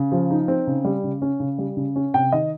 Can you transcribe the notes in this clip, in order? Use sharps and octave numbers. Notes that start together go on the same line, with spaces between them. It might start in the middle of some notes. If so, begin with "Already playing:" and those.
Already playing: C#3
F3
D#4
C4
C#3
G3
C#3
C#4
C#3
G3
C#3
C#4
C3 G5
D#3 D#5